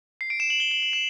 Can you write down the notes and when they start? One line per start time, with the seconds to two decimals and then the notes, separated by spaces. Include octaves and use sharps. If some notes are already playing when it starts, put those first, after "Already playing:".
0.21 C7
0.30 D7
0.40 E7
0.50 F#7
0.60 G7
0.71 F#7
0.82 F#7
0.93 E7